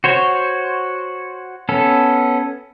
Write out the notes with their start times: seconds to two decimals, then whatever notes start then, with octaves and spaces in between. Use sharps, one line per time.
0.04 F#4 C5 C#5
1.69 B3 C#4 A4